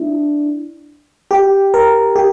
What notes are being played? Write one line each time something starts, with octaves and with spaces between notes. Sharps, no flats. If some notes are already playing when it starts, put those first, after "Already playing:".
Already playing: D4 E4
G4
A#4
G4